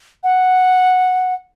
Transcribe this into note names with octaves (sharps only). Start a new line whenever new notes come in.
F#5